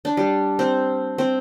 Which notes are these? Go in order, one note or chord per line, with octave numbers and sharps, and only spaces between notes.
D4
G3
C4
C4